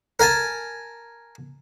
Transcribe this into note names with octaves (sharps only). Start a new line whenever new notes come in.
A#4 G#5 A5